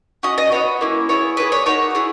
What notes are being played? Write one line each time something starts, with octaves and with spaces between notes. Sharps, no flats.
C#4 F#4 D#5
D#5
B3 D#4 F#4 C#5
A#3 C#4 E4
B3 E4 G#4 C#5
A#3 E4 G#4 B4
C#5
A#3 D#4 F#4 C#5
E4 G#4